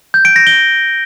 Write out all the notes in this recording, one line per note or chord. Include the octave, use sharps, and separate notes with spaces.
G6
D7
A#6
G7